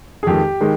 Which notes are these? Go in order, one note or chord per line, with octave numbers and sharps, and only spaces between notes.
G#4
F2 D#3 G#3 G4
D#3 G#3